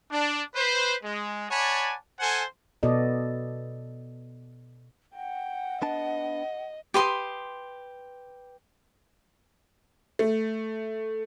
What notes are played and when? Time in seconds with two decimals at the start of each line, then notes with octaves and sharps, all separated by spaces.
0.11 D4
0.55 B4 C5
1.03 G#3
1.51 C#5 D5 F#5 G#5 A5 B5
2.19 A4 C5 F#5 G#5
2.83 B2 B3 F#4 A4 D5 D#5
5.14 F#5 G5
5.82 B3 D4 D#5 A5
6.94 G4 B4 C6 D#6
10.19 A3